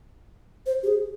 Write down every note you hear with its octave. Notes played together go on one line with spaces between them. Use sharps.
C5
G4
G#4